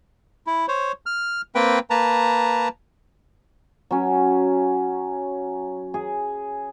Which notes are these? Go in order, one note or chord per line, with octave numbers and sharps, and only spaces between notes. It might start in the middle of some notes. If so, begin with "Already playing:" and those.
E4
C5 C#5
F6
A#3 C4 B4 G5
A#3 B4 A5 A#5
F#3 C#4
G#4